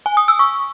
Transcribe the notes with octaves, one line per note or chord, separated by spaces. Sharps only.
G#5
D#6
E6
C#6